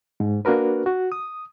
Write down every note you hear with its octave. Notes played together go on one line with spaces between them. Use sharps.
G#2
A#3 D4 F#4 A#4 B4
F#4
D#6